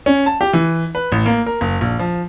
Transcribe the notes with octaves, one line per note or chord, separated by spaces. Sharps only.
C#4
A5
G4
E3
B4
A1
A#3
A#4
F#1
A#1
F3